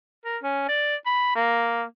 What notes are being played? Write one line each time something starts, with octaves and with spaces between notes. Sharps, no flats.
A#4
C#4
D5
B5
A#3